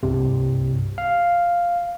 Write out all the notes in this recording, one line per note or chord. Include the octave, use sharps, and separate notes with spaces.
C2 G2 C3
F5